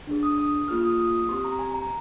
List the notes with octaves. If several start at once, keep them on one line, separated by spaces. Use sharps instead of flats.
D4 G#4
D#6
D#6
A#3 F4 G#4 F6
D#6
D#6
D#6
C4 G4 C6
A#5
G#5
A#5